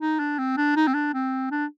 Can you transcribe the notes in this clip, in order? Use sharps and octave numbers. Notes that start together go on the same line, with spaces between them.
D#4
D4
C4
D4
D#4
C4
D4
C4
D4